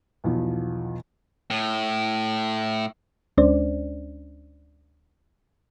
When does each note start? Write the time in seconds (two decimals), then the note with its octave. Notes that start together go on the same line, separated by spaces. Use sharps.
0.24 B1 E2 F3
1.51 A2
3.38 D2 G#3 C#4 D4 C5 D5